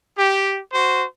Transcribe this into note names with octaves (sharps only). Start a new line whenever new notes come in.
G4
F#4 C5